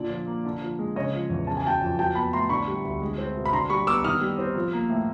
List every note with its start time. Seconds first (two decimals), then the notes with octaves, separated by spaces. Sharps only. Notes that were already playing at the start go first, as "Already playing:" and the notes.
Already playing: A#2 D3 D5
0.10 F3
0.27 A#3
0.45 D3
0.61 F3
0.79 G#3
0.96 C#3 C#5 D#5
1.13 F3
1.30 E2
1.47 C#3 A5
1.57 G#5
1.65 F#3 G5 A5
1.81 F2
1.99 F#3 G5 A5
2.15 B3 A5 B5
2.33 A2 A#5 C6
2.49 D3 B5 C#6
2.68 G3
2.85 D2
3.02 G#3
3.18 C4
3.36 B2
3.46 B5
3.53 D3 A#5 C6
3.70 G3 B5 C#6
3.87 B3 D6 E6
4.04 D#3 D#6 F6
4.21 G3
4.39 C4
4.55 F3
4.73 A#3
4.89 A2